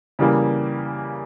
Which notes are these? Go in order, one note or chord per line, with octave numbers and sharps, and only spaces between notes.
C#3 E3 G3 A#3